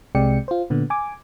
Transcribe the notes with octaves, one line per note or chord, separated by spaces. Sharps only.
C2 C3 G#3 D5 G5 C#7
F4 C5
A#2 D3 B3
G#5 D6